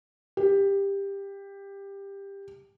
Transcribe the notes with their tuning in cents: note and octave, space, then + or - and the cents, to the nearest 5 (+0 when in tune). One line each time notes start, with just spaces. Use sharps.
G4 +15